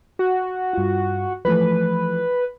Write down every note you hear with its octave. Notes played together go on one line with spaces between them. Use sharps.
F#4
G2 F4
E3 F3 A3 B4